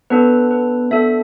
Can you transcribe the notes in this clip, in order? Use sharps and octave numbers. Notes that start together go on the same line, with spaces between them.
B3 D4 A4 B4
B4
B3 D4 A4 E5